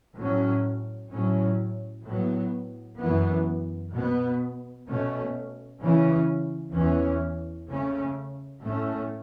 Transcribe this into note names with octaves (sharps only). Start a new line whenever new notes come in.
A2 F#3 C#4
A2 F#3 C#4
A2 F#3 B3
F#2 E3 B3
B2 B3
B2 A3 C#4
C#3 E3 C#4
E2 E3 C#4
C#3 A3 C#4
A2 A3 C#4